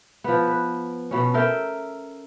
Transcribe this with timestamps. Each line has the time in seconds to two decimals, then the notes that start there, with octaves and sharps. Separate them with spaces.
0.24 F3 B3
0.48 B4
1.11 B2 B3 C#4
1.34 A4 A#4 E5 G5